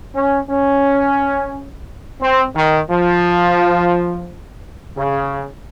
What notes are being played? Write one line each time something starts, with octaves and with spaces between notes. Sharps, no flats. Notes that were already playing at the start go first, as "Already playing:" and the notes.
C#4
C#4
C4
D#3
F3
C#3